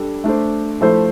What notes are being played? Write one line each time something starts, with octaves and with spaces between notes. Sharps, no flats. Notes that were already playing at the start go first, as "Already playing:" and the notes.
Already playing: G3 D4 A4
A3 D4 A4 C5
F3 A3 E4 A4 C5